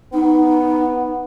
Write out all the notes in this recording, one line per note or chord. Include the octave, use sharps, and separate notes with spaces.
B3 D#4